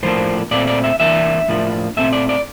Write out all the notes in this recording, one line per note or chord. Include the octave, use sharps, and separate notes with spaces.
A2 F3 A#3 D4 C5
A#2 A3 C4 D5
D5
E5
E3 A#3 D4 E5
A2 F3 A#3 D4
A#2 A3 C4 E5
D5
D5